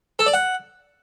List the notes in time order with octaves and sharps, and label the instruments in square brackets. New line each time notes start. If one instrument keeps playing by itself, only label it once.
[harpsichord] A4
D5
F#5